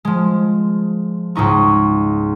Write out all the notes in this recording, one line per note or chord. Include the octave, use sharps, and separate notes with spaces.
F3 G#3
C#2 G#2 D#4 C#6